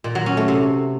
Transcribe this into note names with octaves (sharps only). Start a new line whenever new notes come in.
A#2
F#3
C#4
A3
C3